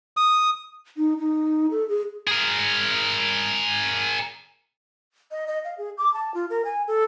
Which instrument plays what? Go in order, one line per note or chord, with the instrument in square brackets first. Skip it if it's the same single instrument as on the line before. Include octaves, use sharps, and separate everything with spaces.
[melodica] D#6
[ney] D#4
D#4
A4
G#4
[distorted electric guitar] G#4 A#4
[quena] D#5
D#5
F5
G#4
D6
A5
F4
A#4
G#5
A4